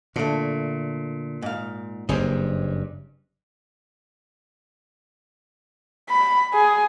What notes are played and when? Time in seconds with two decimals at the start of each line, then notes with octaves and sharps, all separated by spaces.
0.16 A#2 D3 A3
1.42 G#2 F5
2.09 F#1 G2 C4 G#4 D#5
6.10 B5
6.53 G#4